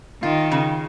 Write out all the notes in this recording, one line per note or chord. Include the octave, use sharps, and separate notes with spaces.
D#3 F4
C#3